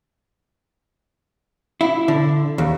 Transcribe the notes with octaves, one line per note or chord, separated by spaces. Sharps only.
E4
D3
D#2